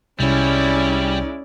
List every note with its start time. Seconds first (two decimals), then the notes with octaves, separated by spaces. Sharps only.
0.20 C2 G3 G#3 C#4 E4 D5